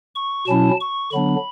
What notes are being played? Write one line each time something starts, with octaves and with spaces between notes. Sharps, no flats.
C#6
B2 F#3 C#4 E4 A5
C#6
D3 F#3 B3 D4 B5